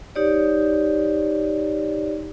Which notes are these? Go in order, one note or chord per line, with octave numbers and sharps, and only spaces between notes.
D#4 G4 C#5 D5